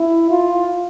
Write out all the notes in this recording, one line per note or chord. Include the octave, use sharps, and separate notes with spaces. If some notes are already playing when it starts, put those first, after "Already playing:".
Already playing: E4
F4